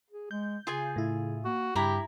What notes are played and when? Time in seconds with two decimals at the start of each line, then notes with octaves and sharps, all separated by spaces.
0.11 G#4
0.31 G#3 G6
0.67 C#3 F4 G#4 G#5
0.96 A2 E4
1.45 A#3 F#4
1.75 G2 C#3 E4 G4 A#5 B5